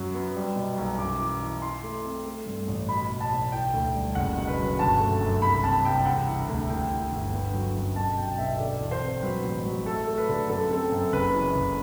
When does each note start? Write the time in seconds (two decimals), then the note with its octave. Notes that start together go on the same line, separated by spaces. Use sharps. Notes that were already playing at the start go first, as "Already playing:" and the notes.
Already playing: F#2 F#3
0.15 B3
0.35 G3
0.56 B2
0.77 B1
0.98 F#2 D6
1.20 E3
1.41 E3
1.62 E3 C6
1.83 A3
2.04 C4
2.25 A3
2.46 G2
2.67 A1
2.89 B2 B5
3.10 B2
3.20 A5
3.31 B1
3.52 E3 G5
3.73 D2
3.94 G3
4.15 F#1 F#5
4.37 B2
4.47 B4
4.58 F#3
4.79 G1 A5
5.00 A3
5.21 F#2
5.42 C2 B5
5.63 C4 A5
5.84 C2 G5
6.06 E1 F#5
6.27 E3
6.48 D2
6.69 E3 G5
6.90 E3
7.12 G1
7.33 B3
7.53 F#3
7.75 F#2
7.96 B2 A5
8.17 B1 G5
8.38 B2 E5
8.59 D3 D5
8.80 E2
8.91 C5
9.01 C4
9.23 F#3 B4
9.44 A1
9.65 F#3
9.86 A3 A4
10.07 A3
10.18 B4
10.29 D3
10.49 F#2 A4
10.71 C4 A4
10.92 F#2
11.12 F#1 B4
11.34 E3
11.55 F#1